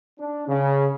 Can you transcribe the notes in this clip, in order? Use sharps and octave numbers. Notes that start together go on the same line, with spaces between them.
D4
C#3